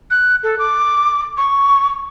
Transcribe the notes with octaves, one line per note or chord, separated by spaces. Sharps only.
F#6
A4
D6
C#6